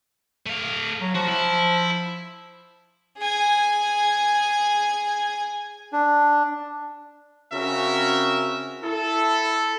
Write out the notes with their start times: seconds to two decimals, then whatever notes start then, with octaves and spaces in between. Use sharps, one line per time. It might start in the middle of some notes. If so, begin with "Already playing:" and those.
0.46 A3 F5
1.01 F#3
1.15 F3 F#4
1.28 E4
3.18 G#4 G#5
5.93 D4
7.52 C#3 C4 C#4 F#4 A#4 E5
8.83 E4 A4